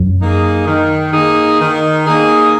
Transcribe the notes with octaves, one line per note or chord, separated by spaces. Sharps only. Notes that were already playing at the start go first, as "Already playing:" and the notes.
Already playing: F#2 F#3
A#3 D#4 G#4
D#3
A#3 D#4 G#4
D#3
A#3 D#4 G#4